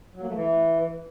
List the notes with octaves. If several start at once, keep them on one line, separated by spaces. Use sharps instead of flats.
F#3
A#3
A3
E3